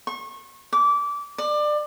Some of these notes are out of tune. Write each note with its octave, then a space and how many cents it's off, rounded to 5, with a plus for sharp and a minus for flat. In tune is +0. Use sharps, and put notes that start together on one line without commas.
C#6 -35
D6 -20
D5 +25